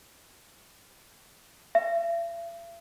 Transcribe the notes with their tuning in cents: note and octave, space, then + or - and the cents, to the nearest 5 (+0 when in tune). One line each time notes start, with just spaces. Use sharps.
E5 +45